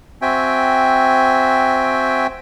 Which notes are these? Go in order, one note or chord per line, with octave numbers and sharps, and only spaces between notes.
C4 F#4 E5 G5 G#5